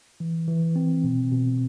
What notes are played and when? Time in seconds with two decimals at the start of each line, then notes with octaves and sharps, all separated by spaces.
0.20 E3
0.48 E3
0.76 C4
1.04 B2
1.32 B2